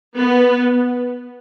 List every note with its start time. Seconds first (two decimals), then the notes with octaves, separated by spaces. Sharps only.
0.18 B3